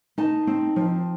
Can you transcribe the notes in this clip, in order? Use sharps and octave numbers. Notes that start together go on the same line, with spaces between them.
D#4 A5
C4
F3